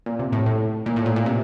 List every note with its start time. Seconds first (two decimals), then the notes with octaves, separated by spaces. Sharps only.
0.06 A#2
0.19 C3
0.32 A2
0.46 A2
0.86 A#2
0.96 A2
1.06 A#2
1.16 A#2
1.26 C3